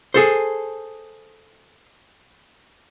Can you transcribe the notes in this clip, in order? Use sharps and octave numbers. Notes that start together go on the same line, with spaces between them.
G#4 A4 C5